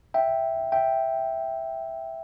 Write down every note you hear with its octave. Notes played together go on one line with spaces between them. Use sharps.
E5 G5
E5 G5